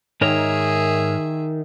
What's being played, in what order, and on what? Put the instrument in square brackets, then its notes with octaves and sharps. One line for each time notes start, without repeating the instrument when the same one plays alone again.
[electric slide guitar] G#2 A#4 C#5 [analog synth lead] D#3 [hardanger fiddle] G#4 E5